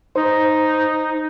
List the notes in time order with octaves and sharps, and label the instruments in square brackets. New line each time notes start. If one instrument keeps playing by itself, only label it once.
[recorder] D#4 [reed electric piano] C5